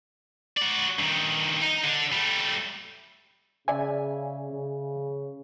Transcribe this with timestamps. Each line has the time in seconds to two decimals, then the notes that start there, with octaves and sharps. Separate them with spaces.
0.57 F#4 D5
0.99 G2 D#3
1.62 D#4
1.84 D3
2.12 G3 A3
3.68 C#3 D5 E5 G#5
4.51 C#3